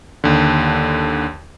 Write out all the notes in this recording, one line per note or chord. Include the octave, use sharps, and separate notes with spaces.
D#2 D3